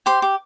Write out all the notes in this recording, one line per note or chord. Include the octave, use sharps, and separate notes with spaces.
G4 C5 C6
G4